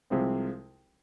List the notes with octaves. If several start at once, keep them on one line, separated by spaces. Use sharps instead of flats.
C2 C3 F3 G#3 C4